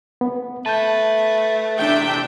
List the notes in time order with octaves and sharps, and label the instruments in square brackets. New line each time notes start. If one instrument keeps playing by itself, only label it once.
[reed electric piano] B3
[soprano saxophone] A3 [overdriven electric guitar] B4 [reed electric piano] A5 G6
[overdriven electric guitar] E2 C3 [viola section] D4 E5 G5